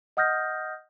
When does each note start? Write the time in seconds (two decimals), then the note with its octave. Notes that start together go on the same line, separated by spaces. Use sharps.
0.17 D#5 F#5 D#6 F6 G6 A#6